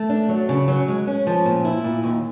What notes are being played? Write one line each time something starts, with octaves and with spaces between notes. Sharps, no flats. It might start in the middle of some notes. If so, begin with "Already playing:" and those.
Already playing: A3
D4
F#3
C#3
F#3
G#3
C#4
F3
A#2
E4
A#2
D#2